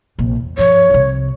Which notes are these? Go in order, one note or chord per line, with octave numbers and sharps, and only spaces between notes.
A#1 C3
E2
G2 F3 C#5
C2 C3